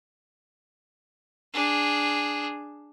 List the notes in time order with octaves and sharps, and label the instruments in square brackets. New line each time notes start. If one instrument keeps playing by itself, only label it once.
[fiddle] D4 G#4